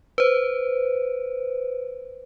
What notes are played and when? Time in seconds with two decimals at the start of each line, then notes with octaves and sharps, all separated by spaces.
0.18 B4 C5